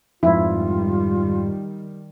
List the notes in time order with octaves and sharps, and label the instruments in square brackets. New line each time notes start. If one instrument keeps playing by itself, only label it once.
[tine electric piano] F2 G#2 [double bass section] D#3 G3 [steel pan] F3 E4 [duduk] F4